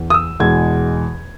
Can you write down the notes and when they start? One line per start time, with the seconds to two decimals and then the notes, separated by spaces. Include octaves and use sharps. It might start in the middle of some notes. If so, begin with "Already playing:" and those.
Already playing: E2
0.10 D#6
0.14 E6
0.40 E2 B2 G#3 G#6